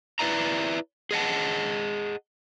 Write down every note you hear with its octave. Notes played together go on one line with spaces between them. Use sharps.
E4 B4 D5 E5 A#5
G#4 D#5 F#5 A5